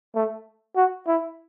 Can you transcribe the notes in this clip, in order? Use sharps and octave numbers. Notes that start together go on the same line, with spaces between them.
A3
F#4
E4